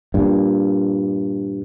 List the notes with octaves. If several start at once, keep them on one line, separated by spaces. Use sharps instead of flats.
G2 A#2